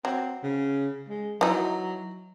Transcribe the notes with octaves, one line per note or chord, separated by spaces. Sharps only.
F#3 C4
C#3
G#3
E3 F#3 D#4